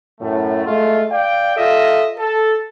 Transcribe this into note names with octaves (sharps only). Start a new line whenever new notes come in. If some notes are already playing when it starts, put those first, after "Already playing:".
F#2 A2 A3
G#3 A3 F4
D5 F5 G5
F4 A4 D#5 E5
A4